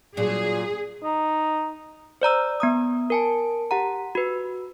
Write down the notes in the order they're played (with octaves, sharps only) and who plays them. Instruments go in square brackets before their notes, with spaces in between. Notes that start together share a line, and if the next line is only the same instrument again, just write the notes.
[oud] A#2 F#3 [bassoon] D4 [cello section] G#4
[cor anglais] D#4
[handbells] C5 D5 A#5 E6
B3 A#5 D#6
A#4 G#5 A5
G4 F#5 A#5
F#4 B4